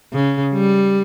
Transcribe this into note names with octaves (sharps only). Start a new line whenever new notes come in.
C#3
G3